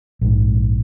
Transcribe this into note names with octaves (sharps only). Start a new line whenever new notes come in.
A#1 G#2